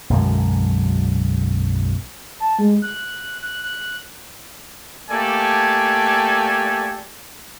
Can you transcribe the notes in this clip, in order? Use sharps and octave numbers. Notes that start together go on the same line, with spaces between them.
B1 F#2 D3 G#3
A5
G#3
F#6
F#6
F#6
A3 A#3 G4 A4 D5 G#5